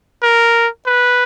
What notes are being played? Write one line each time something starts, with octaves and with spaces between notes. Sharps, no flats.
A#4
B4